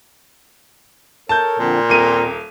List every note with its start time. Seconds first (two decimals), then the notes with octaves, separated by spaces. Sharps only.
1.29 A4 A#4 C#5 A5 G6
1.59 A#2 D3 F3 C4
1.89 D#1 C4 A#4 D#7